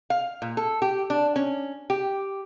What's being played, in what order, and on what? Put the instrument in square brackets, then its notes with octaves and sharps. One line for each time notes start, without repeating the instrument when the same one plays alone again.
[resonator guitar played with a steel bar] F5
A#2
A4
G4
D4
C#4
G4